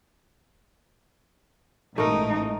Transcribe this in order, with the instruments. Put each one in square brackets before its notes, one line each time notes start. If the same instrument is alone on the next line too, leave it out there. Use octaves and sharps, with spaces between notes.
[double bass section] A1 G#2 [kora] A3 A#4 [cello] D#4